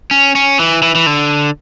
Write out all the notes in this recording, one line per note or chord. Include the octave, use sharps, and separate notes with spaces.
C#4
C#4
E3
E3
E3
D3